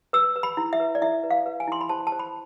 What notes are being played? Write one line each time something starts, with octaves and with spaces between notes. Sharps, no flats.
B4 E6
B4
B5
E4
E5
B4
D5
E4 E5
B4
F5
B4
G#5
E4 C6
B5
C5 A5
A5
C5
B5